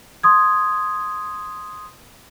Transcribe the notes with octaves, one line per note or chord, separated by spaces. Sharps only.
C6 D#6 G#6